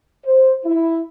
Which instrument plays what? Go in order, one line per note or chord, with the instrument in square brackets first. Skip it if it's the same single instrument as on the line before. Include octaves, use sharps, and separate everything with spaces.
[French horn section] C5
E4